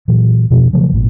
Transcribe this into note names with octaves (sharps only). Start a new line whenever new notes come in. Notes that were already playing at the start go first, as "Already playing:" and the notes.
A#2 E3 F#3
F2 B2 F3 C#4
C#3 F3 F#3 A3
G#1 A#2